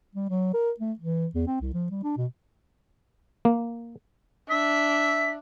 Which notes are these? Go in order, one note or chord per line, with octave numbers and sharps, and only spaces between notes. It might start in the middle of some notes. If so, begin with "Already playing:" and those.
G3
F#3
A#4
A3
E3
E2
C4
C2
F3
G3
D4
B2
A#3
D4 E5 B6